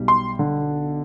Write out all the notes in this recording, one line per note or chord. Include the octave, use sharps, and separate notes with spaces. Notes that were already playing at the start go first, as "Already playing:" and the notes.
Already playing: B1 G3
C6
D3